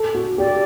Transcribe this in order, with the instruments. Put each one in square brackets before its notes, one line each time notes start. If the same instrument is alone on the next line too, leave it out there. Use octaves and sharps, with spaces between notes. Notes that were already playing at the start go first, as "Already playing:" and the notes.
Already playing: [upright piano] A4
F#4
[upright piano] G4 [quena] D5